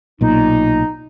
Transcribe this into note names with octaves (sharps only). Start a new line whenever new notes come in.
B1 A#2 D#4